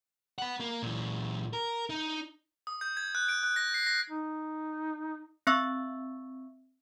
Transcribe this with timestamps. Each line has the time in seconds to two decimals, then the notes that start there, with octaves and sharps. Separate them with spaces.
0.38 F#5 B5
0.60 A#3
0.83 A#2 E3
1.53 A#4
1.90 D#4
2.67 D#6
2.81 G6
2.97 G#6
3.15 F#6
3.29 D7
3.43 F#6
3.56 A#6
3.74 C7
3.87 A#6
4.10 D#4
5.47 C4 E5 C#6 E6